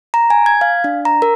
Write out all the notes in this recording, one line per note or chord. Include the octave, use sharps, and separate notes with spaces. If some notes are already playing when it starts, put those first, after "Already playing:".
A#5
G#5
G#6
F5
D4
A#5
A#4